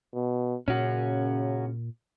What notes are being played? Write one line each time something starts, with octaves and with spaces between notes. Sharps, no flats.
B2
A#2 C#3 C#4 F#4